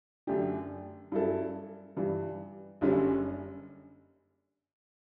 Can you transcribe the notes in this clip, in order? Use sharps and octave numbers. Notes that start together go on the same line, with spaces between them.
F#2 D3 A3 D4 G4
G2 F#3 C#4 E4 A4
G2 E3 G3
F#1 F#2 D3 G3 C#4